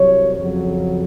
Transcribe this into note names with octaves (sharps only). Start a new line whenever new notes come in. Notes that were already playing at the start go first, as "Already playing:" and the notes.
Already playing: C2 C3 F#3 C#5
F2 C#3 F#3